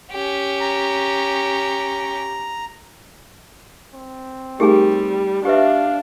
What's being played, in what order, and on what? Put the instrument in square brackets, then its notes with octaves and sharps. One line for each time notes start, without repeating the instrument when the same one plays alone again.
[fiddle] C#4 G4
[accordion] A#5
[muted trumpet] C4
[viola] G3 [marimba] A3 D#4 A#4 [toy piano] G4 G#4 G#5
[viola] D4 [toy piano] G4 B4 E5 [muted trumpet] F5